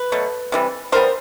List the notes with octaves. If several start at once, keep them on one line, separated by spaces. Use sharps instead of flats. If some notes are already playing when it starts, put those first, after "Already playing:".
Already playing: B4
B2 F#3 A3
C3 E3 G3
E3 G3 B3 A#4 C5